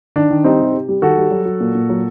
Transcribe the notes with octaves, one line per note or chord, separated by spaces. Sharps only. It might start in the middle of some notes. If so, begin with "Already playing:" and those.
D#3 D4
D#3
G3 C4 D#4
C3
C3
G3
D#3 F#4 A4
G3
F#3
F#3
A#2
A#2
F#3